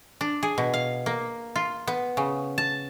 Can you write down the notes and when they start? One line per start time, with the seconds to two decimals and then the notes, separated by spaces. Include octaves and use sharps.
0.21 D4
0.43 G#4
0.58 B2
0.74 F5
1.06 A#3
1.56 F4
1.87 B3
2.17 C#3
2.58 A5